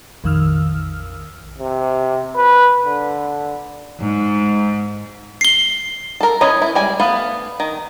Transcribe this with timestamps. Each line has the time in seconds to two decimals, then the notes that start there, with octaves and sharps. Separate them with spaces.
0.24 A#1 F2 D#3 E6 F6
1.58 C3
2.36 B4
2.85 D3
3.99 G#2
5.41 C7 G7
6.20 A4 A#4
6.41 E3 C#4 B4 C#5 D#5
6.62 E4
6.75 G3 G#3 G#5
7.00 A3 B3 B4 F5
7.60 D#3